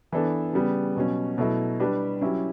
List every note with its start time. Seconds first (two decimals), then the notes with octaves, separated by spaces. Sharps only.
0.12 E3 B3 D4 A4
0.53 C#3 G3 B3
0.96 B2 F#3 C#4
1.38 B2 F#3 A3 E4
1.80 G3 D4 G4 B4
2.21 F#3 C#4 E4 G4